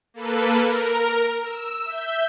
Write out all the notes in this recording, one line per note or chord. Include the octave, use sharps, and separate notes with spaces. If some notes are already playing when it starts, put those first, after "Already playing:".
A#3 A4 B4
A#4
E6
E5 G6